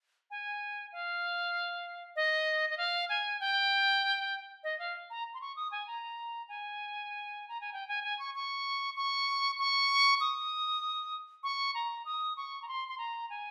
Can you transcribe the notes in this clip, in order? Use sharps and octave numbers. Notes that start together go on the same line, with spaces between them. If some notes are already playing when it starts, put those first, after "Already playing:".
G#5
F5
D#5
D#5
F5
G#5
G5
D#5
F5
A#5
C6
C#6
D#6
G#5
A#5
G#5
A#5
G#5
G5
G#5
G#5
C#6
C#6
C#6
C#6
D#6
C#6
A#5
D#6
C#6
A#5
C6
C6
A#5
G#5